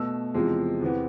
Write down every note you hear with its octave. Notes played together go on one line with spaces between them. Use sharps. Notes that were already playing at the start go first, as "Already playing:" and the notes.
Already playing: B2 A3 E6
E2 C3 F3 G#3
E2 C3 E3 B3